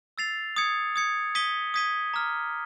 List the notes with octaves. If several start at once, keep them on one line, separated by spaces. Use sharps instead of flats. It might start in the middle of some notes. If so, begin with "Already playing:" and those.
E6 A6 C7 F7
D#6 G#6 C#7
D#6 G#6 C#7
D#6 G#6 B6 D#7 G7
D#6 G#6 B6 D#7 G7
A#5 D6 F6